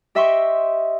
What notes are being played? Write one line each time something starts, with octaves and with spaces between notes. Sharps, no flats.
G4 D#5 E5 G5 C6 C#6